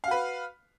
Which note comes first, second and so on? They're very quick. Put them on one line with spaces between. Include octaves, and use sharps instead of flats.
F5 F#4 B4